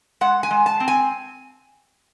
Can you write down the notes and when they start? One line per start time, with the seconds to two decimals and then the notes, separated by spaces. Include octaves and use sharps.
0.21 G#3 F#5
0.43 G#5
0.51 G#3
0.66 A5
0.80 C4
0.88 G#5